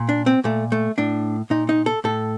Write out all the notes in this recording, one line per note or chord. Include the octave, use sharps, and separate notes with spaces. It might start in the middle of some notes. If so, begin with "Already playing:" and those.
Already playing: A#2
D4
C4
A#2 A3
A3
A2 D4
A#2 D#4
D#4
A4
A2 A4